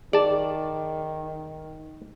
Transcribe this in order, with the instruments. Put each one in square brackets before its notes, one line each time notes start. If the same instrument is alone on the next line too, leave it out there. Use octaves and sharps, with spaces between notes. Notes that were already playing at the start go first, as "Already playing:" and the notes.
[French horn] D#3 [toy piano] G#4 [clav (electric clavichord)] D5 A5